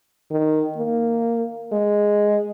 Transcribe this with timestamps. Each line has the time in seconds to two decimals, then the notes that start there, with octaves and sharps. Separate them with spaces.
0.31 D#3
0.77 A#3
1.72 G#3